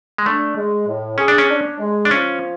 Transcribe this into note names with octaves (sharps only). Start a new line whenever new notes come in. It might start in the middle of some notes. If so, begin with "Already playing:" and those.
G#3
A3 D4
G#3
A2
C#4 G#4
D4
C#4
D4
G#3
D4
F3 C#4